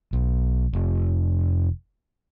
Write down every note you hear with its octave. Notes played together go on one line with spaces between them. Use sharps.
B1
F1